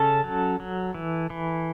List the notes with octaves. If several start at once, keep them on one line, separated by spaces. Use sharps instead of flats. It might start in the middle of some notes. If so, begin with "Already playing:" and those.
Already playing: C#3 C#4 A4 A5
F#3
F#3
E3
E3